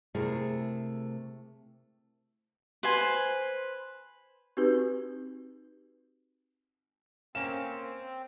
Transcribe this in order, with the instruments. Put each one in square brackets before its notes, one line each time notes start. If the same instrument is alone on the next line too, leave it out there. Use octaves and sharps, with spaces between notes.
[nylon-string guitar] C3 A3 E4 G#4 A#4
[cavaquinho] B4 C5 G#5
[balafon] C4 D#4 F#4 G4 B4
[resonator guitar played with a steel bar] A#3 C#4 F5 [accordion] C4 [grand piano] E7